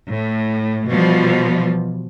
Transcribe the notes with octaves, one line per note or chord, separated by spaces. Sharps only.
A2
B2 E3 F3 G3